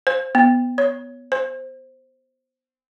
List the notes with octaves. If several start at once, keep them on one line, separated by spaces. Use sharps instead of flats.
C5
B3
C#5
C5